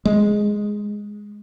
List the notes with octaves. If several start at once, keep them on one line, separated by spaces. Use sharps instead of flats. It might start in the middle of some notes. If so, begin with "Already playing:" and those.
G#3